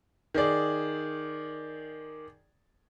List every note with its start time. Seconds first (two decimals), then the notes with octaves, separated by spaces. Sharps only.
0.34 D#3 G#4 D5